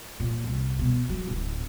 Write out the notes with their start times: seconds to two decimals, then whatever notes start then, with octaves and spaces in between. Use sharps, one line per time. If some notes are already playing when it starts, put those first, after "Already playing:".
0.20 A#2
0.44 C2
0.79 B2
1.09 F#3
1.27 D1